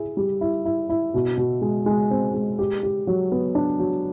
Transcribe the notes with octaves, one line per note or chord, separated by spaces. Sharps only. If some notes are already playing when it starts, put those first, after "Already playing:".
Already playing: E4 G#4
G3
E4
E4
E4
B2
B2
G#3
G#3
C4
G#3
G4
G4
F#3
B3
D4
F#3